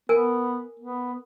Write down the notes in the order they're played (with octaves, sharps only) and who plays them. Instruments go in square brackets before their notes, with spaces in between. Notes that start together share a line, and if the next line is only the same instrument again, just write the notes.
[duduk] B3 [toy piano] A#4 G#5
[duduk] B3